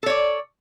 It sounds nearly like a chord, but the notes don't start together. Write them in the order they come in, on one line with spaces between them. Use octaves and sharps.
A4 C#5 D5